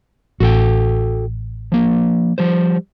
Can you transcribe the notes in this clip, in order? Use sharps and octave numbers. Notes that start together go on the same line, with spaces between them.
A1 F#4 A4 G5
F3 A#3
F3 G3 C5